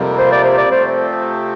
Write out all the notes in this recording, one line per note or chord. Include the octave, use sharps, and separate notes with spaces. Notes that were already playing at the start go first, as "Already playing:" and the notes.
Already playing: F2 C3 G3 A#3
C5
D5
C5
D5
C3 F3 A3 C4 C5